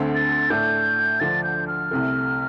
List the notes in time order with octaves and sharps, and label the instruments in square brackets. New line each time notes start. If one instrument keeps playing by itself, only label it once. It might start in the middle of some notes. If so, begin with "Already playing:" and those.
Already playing: [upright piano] D2 D3 A3 C4
[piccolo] A6
[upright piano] A2 A3 D4 [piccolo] G6
[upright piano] D2 D3 F3 D4 [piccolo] A6
[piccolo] G6
F6
[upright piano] C2 C3 A3